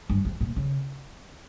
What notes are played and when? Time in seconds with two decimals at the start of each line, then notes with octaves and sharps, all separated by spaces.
0.10 G2
0.25 F2
0.41 A#2
0.56 C#3